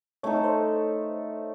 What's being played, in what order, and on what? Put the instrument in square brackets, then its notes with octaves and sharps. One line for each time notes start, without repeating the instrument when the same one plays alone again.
[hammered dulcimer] A3 D#4 A4 [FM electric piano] C#5
[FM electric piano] C#5
C5